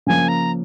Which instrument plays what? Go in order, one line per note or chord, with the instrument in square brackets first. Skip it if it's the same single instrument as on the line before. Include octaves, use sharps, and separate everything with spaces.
[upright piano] C#3 F3 A#3 [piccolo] G#5
[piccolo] A#5